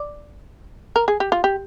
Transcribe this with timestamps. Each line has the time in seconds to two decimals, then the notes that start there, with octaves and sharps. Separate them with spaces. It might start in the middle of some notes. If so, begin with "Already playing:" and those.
Already playing: D5
0.96 A#4
1.08 G#4
1.20 G4
1.32 F4
1.44 G4